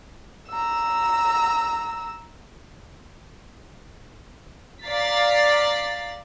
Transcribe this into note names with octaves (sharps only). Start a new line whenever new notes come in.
A#5 E6
D5 F5 A#5 A6 B6 C7